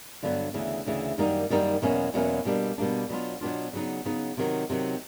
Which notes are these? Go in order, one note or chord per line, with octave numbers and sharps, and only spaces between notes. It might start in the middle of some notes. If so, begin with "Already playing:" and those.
G2 D3 F#3 B3
D2 C#3 E3
D2 C#3 E3
F#2 D#3 G3 A#3 D#4
F#2 D#3 G3 A#3 D#4
E2 B2 F#3 A#3 C#4
E2 B2 F#3 A#3 C#4
B2 G3 A#3 D4
B2 G3 A#3 D4
B2 F#3 B3 D4 F4
B2 F#3 B3 D4 F4
C#3 F#3 B3 D#4
C#3 F#3 B3 D#4
C3 D#3 F#3
C3 D#3 F#3